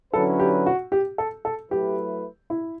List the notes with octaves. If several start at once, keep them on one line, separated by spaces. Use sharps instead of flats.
D3 F#3 C#4 E4 A4 B4
G4
F#4
G4
A4
A4
F#3 A3 E4 G4 B4
E4